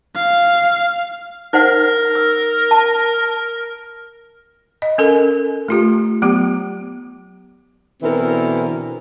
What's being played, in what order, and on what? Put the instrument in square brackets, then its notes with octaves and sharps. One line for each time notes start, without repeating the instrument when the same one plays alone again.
[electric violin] F5
[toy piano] D#4 C5 F#5 [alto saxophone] A#4
[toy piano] E6
A5
[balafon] D#5
C#4 A4 A#4
A3 F4 G4
F#3 B3 G4
[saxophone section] B2 D3 E3 C4 E4 A#4